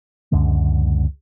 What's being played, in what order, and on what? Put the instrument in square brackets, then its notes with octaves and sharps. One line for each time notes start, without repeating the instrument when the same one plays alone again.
[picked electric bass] C#2 F#2 D3 G#3